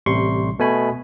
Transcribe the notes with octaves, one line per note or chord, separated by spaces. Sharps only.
A1 C3 G3 C6 C#6
B2 A3 G#5 B5